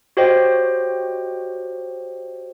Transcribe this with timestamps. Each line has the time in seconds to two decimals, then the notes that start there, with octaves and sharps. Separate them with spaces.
0.17 F#4 G4 C5 C#5 D#5 G5